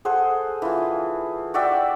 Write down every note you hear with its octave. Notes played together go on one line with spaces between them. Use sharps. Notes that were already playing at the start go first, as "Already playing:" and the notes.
G#4 A4 C5 F#5
E3 F4
F#4 D5 E5 G5